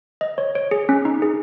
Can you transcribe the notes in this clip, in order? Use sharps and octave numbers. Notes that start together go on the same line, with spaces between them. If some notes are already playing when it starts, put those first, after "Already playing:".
D#5
C#5
C#5
G#4
C#4
D#4
G#4